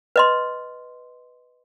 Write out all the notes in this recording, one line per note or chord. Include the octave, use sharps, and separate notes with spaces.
B4 D#5 C6